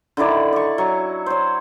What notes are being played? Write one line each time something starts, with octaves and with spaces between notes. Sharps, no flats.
D3 D#3 E4 D5
D5 C#6
F#3 C#6
C5 C#5